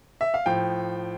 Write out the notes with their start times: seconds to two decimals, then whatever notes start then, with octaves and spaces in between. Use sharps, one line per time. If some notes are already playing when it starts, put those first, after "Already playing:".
0.21 E5
0.34 F5
0.46 A2 F3 G5